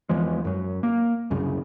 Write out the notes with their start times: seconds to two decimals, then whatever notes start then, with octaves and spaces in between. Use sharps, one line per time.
0.09 E2 E3 F3 G#3
0.45 F#2 F#3
0.83 A#3
1.30 C2 F#2 C#3